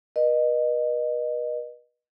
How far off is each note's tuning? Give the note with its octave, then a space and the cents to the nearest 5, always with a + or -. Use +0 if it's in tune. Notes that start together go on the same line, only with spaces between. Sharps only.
B4 -40 D#5 -25